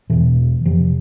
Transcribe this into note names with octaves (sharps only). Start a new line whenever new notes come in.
E2 B2 E3
F2 C3 F3